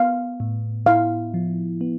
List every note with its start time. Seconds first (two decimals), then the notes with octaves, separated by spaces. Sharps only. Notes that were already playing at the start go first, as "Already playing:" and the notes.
Already playing: B3 F5
0.40 A2
0.86 E4 F5
1.34 F3
1.81 B3